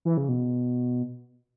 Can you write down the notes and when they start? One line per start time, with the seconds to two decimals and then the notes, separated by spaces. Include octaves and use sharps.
0.05 E3
0.17 C#3
0.29 B2